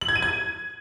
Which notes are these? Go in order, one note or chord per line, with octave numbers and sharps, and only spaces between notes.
F#7
G#6
D#7
G#6